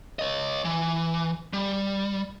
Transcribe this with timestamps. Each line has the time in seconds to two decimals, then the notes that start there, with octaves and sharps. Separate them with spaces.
0.19 C#5 D#5
0.65 E3
1.53 G3